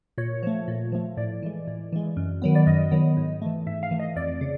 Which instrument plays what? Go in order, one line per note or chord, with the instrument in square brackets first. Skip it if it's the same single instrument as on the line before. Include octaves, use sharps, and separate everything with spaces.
[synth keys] A#2 C#5
F3 A3
A#2
F3 A3
A2 D5
E3 G#3
A2
E3 G#3
F#2
D#3 F#3 B3
D5
F#2 D#5
D#3 F#3 B3
G#2
E3 A3
G#2 E5
F5
E3 A3
D#5
F2 D5
C#3